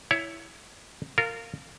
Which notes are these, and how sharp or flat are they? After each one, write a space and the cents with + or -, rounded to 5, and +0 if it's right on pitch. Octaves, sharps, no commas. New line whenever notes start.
E4 +0 C#5 +20
F4 +0 A#4 -25